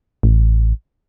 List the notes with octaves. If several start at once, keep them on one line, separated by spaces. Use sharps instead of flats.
A1